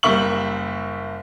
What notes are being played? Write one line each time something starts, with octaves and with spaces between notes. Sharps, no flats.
F#1 G3 A#3 E5 C#6 F#7